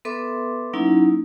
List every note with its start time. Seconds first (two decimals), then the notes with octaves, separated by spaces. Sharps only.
0.05 B3 A4 B4 E5 C6 D6
0.73 F#3 A#3 C#4 D#4 E4